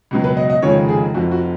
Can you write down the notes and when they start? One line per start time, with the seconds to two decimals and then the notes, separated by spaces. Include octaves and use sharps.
0.11 C#2 B2 F#3
0.24 B4
0.37 D#5
0.50 D#5
0.62 F1 D#2 C#3 F3 G#3 C#5
0.89 G#4
1.14 F1 F2 F3 F#4
1.31 F#4